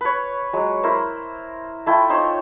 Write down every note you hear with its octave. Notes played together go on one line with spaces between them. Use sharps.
B4 C#5
F#3 G#3
E4 A#4 C5
A3 E4 F4 G5
D#4 C5 C#5